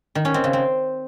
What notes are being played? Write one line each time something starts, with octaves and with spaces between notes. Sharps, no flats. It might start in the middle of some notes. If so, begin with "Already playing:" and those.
D#3
C#4
C4
C#3
C4